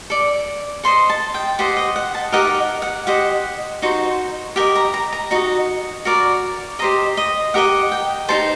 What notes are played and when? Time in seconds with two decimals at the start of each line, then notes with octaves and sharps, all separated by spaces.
0.10 A4 D5
0.83 A4 C5 D#5 C6
1.10 A5
1.34 G5
1.59 G4 C5 D#5 F#5
1.77 D#5
1.96 F#5
2.15 A5
2.32 D#4 G4 A#4 D#5 F#5
2.82 F#5
3.07 G4 C5 D#5 F#5
3.82 D#4 F#4 C5
4.56 G4 A#4 D#5 G5
4.76 A#5
4.94 A#5
5.12 A#5
5.31 D#4 F#4 D#5
6.05 F#4 A#4 D5
6.79 G4 C5 D#5 A#5
7.17 D#5
7.54 G4 A#4 D#5 F#5
7.92 G5
8.29 D#4 A4 C5 A5